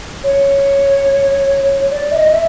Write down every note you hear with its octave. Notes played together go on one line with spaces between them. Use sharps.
C#5
D5
E5
D#5
E5